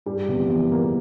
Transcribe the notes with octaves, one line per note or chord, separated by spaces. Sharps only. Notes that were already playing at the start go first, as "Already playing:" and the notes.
G2 G3
E2 C3
F3
E2 E3
F3 A#3